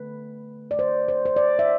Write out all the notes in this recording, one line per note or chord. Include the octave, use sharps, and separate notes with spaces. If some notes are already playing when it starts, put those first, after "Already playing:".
Already playing: D3 A3 B4
D5
C5
C5
C5
D5
E5